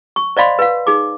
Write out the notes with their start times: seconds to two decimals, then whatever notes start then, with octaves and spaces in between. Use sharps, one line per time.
0.16 C#6
0.37 C5 D5 D#5 F5 B5 C6
0.59 B4 F5
0.87 D#4 G#4 D6